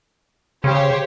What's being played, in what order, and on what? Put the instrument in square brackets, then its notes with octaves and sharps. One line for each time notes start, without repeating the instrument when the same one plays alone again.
[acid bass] C#3 [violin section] G4 C5 C#5